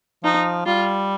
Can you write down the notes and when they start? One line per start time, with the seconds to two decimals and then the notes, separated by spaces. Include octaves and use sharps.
0.24 F3 D#4
0.66 G3 F4